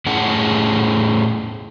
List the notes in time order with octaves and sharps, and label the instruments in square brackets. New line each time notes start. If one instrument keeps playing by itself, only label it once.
[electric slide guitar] A2 C#4 G#4 F#5